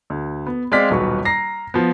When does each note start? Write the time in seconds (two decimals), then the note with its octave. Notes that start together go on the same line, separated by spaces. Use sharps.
0.10 D2
0.47 B3
0.72 G#3 C4 D5 F5 F6 B6
0.90 D#1 B1 F#4 B4 C#6
1.25 A#5 A#6 C7
1.74 F3 B3